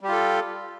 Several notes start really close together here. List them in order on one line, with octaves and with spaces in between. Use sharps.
G3 G4 F4 A4